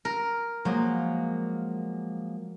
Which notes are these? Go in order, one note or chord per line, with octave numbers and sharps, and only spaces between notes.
A#4
F3 F#3 G#3 A#3